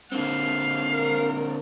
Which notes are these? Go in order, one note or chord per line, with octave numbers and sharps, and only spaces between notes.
D3 A#3 C4 F5
A#4